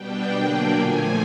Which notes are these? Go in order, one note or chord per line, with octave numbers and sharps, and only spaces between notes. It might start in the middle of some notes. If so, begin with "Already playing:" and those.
Already playing: B2 G3 B3 D4 G5
D3 F#3 A#3 D4
A#2 F3 A3 G#5